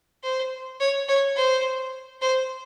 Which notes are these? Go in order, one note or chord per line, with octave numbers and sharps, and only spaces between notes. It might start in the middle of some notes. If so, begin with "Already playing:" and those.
C5
C#5
C#5
C5
C5